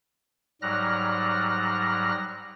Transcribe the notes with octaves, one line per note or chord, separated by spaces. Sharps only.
G#2 F#3 G3 F6 F#6 A#6